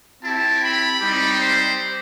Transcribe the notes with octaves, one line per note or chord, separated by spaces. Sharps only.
C4 E4 G4 A5
B5
G3 C4 D#4 G4
C5